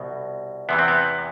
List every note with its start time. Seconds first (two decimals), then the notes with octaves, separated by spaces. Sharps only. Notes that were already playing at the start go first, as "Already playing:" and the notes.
Already playing: C2 B2
0.69 E2 C3 E3 B3
0.79 C4
0.88 B3